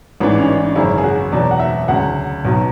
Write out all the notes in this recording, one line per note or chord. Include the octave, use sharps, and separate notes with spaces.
A1 G#2 E3 D4
C#4
D4
G#1 F#2 C#3 F#3 E4
G#4
F#4
E2 B2 F#3 D5
F#5
E5
D2 C#3 F#3 F#5
B1 B2 F#3